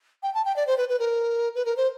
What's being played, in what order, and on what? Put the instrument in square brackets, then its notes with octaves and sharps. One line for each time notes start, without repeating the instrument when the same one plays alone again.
[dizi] G5
A5
G5
D5
C5
B4
B4
A#4
B4
A#4
C5